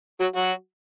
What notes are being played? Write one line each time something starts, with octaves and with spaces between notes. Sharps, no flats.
F#3 F#4
F#3 F#4